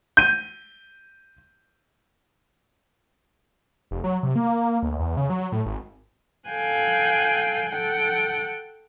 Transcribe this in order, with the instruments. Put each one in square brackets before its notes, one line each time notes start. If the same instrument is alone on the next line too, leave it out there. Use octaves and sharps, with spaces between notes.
[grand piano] G6 D#7
[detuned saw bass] F1
F#3
C3
A#3
D2
E2
C#3
F#3
A2
G#1
[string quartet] A4 F5 G5 G#5 F#6 G6
A4 F#5 G5